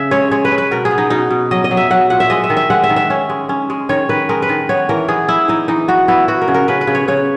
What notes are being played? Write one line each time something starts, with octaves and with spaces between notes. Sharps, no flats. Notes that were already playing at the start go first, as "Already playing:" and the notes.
Already playing: C#3 E5
G#3 C#5
G#3 C#5
B4
C#4
B4
B2 A#4
G#4
B3
D#4
B2 D#4
B2
F#3 D#5
D#5
F#3
E5
F#3 F#5
A#2 F#5
E5
G#3 D#5
E5
D#3
E5
G#3 F#5
E5
D#3
E5
C#4
G#3
C#4
G#3
D#3 C#5
D#3 B4
G#3 A#4
B4
D#3
B3 C#5
E3 A#4
B3 G#4
E3 E4
E3 D#4
E3 D#4
B3 F#4
B3 E4
B3 F#4
A#4
C#3
A#4
C#3 B4
B4
C#3
C#5
C#3 C#5